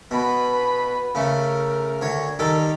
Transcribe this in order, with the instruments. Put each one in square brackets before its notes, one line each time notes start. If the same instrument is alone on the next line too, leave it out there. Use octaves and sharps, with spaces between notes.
[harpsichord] B2 [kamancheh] B4 B5
[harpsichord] C#3 A3 [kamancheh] A#4
[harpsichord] D2 C#5
[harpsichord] D#3 G3 A4 [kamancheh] A#5